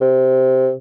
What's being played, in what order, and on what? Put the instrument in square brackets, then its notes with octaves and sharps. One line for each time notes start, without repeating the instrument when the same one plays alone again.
[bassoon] C3